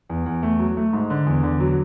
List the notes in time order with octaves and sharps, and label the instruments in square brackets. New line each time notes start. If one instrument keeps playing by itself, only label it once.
[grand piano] E2
E2
A3
F#3
A3
G#2
D3
E2
D3
F#3